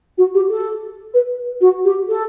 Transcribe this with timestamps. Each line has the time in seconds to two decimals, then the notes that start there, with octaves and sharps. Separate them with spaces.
0.17 F#4
0.34 G4
0.49 A4
1.13 B4
1.60 F#4
1.84 G4
2.08 A4